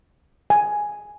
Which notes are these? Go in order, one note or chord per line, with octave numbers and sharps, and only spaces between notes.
G#5